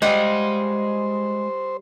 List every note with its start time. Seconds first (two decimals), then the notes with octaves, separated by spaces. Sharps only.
0.02 G3 G#3 F4 C5 D#5 F#5 G#5